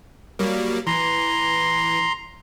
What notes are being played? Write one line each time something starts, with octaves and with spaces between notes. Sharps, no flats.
F#3 G3 A#3
E3 A#5 C6